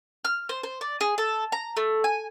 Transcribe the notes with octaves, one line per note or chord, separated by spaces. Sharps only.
F6
C5
C5
D5
G#4
A4
A#5
A3
G#5